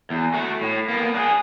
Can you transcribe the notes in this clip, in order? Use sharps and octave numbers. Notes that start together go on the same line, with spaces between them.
E2
A3 F#4
A2
A#3 B3
D4 G#4